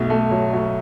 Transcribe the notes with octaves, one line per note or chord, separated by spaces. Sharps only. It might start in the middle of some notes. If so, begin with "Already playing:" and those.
Already playing: B1 B2 A3
A3
F#3
F#3